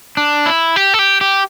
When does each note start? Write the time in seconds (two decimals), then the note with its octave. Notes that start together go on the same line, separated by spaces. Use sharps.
0.17 D4
0.46 E4
0.76 G4
0.94 A4
0.99 G4
1.21 G4